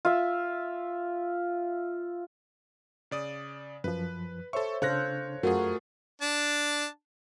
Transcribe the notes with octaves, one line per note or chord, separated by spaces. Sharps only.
F4 E5
C#3 D5 D#6
F#2 F3 B4
A4 C5 C#5 E5 C#6
C#3 D4 A4 C5 C#5 F5 F#6 A#6
F#2 A3 F4 F#4 G#4 A#4
D4 A5